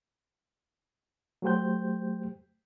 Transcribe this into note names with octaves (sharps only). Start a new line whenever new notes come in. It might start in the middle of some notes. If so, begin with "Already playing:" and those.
F#3 A3 G4 C5 G5 G6